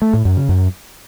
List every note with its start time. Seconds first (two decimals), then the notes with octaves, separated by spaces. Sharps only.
0.02 A3
0.13 A2
0.25 F#2
0.37 C#3
0.49 F#2